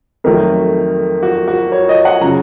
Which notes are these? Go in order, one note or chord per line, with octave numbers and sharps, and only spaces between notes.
F2 D#3 F#3 A3 A#4
F#4
F#4
C#5
D#5
F#5
C#3 F#3 A#5